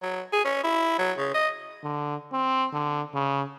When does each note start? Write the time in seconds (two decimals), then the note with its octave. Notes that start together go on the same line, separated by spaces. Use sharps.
0.02 F#3
0.33 G#4
0.45 C#4
0.64 E4
0.99 F#3
1.18 C#3
1.34 D#5
1.84 D3
2.33 C4
2.73 D3
3.14 C#3